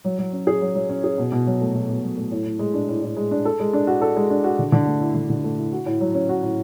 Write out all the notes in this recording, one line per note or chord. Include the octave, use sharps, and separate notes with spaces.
F#3
F#3
C#4
G#4
F#3
F#3
C#4
G#4
B2
B2
F#3
A3
B2
B2
F#3
A3
A2
A2
G#3
D4
A2
A2
G#3
D4
A4
G#3
D4
F#4
A4
G#3
D4
F#4
D3
D3
A3
E4
D3
D3
A3
E4
F#4
A2
F#3
C#4
F#4
A2